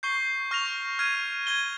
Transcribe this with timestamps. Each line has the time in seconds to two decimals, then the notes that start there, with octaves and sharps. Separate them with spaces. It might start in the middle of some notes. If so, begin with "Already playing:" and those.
0.03 C#6 G6 C7 G7
0.51 C#6 F6 A#6 F7
0.99 F6 G#6 D#7
1.47 G#6 D#7 G7